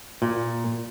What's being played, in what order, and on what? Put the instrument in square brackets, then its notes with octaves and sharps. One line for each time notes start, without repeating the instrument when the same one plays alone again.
[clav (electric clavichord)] A#2